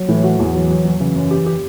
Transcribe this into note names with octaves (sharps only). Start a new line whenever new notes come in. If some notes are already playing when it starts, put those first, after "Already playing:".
Already playing: F#3
A2 E3
F#4
E2 E3
F#3
F#3
F#3
C#3 E3
F#2
G4
G4